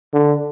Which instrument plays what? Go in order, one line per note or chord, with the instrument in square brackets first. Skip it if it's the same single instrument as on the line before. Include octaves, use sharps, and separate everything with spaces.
[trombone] D3